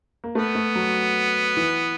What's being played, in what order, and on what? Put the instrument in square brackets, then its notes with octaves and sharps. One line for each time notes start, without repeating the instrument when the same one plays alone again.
[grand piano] A#3
[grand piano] A3 [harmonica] B3
[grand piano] A3
F#3
E3